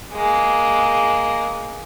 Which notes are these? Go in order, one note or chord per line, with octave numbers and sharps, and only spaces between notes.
G#3 A#3